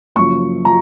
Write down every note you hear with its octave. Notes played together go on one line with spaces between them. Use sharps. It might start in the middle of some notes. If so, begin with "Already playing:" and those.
F#1 F#2 F3 C#6
F3 A#5